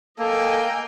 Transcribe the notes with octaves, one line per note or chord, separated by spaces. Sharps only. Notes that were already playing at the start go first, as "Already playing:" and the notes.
A#3 A4 D#5 G5 G#5